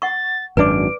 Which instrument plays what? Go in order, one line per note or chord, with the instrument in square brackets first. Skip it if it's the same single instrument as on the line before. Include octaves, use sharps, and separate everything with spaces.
[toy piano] F#5 C#6 [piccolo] A6
[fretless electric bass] G#1 F#2 D4 [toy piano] B4 D5 D6 [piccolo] D7